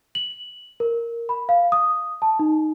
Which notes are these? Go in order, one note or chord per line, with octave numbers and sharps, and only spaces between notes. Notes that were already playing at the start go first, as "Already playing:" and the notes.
F#7
A#4
B5
F5
D#6
A5
D#4